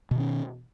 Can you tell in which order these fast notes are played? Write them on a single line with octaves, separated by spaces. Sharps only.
B2 D#3 C#4